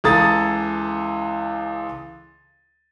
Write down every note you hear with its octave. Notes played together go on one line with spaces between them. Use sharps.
C#2 E3 A4 A#5 D#6 A6